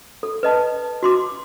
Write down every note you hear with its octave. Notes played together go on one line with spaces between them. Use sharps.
A4
B4 D#5 A5
F#4 C6 D6